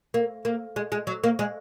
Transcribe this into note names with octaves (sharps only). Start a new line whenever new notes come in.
A#3
A#3
G#3
G#3
F#3
A#3
G#3